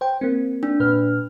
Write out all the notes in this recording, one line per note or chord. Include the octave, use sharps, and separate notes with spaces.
C5 G5
A#3 C4
D4
A#2 B4 F6